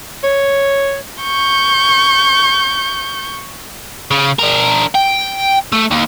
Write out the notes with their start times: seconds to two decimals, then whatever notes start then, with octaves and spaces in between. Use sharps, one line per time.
0.24 C#5
1.22 C#6 G6
4.11 C#3
4.39 D4 A#4
4.94 G5
5.72 A3
5.91 D#2